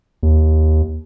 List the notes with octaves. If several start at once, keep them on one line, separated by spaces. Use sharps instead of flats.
D#2